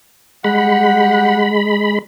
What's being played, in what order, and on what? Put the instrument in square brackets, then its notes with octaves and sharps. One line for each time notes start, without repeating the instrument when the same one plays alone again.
[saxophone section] G3 F#5 [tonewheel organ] G#3 B5